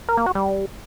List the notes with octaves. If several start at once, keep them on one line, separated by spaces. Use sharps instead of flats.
A#4
A#3
F#4
G3